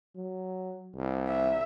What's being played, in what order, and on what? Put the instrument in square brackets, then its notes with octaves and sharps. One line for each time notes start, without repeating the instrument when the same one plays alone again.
[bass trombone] F#3
C2
[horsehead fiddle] E5